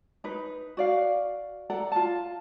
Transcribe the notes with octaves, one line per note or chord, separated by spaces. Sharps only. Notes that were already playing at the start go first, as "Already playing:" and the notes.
D#4 B4
F#4 D5 F5
A4 D5 F#5 A#5
F4 A5